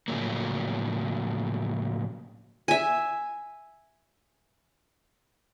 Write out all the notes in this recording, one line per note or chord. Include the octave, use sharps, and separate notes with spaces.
A2 C#3 F3 F#3 A#3
E5 G#5